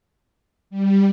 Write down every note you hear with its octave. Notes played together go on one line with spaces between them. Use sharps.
G3